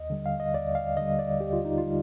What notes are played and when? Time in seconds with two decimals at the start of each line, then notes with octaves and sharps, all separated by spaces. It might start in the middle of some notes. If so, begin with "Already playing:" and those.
Already playing: D#2 D#5
0.10 D3 G3
0.26 F5
0.40 D#5
0.54 D#2 D5
0.75 F5
0.97 D3 G3 D#5
1.19 D5
1.40 D#2 G4
1.53 F4
1.65 D#4
1.78 F4
1.84 D3 G3